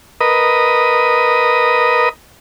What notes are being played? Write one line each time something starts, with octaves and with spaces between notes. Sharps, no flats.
A#4 B4 D#5 D#6